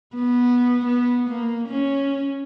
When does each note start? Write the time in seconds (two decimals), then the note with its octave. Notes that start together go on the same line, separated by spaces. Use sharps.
0.16 B3
0.85 B3
1.29 A#3
1.68 C#4